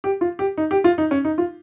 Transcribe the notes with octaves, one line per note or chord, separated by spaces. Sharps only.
G4
F4
G4
D#4
G4
F4
D#4
C#4
D#4
F4